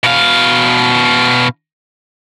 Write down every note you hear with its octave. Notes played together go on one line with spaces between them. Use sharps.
B2 F5